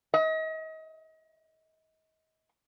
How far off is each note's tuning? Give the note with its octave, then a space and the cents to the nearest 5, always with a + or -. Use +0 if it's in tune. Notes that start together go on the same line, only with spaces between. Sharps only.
D#5 +35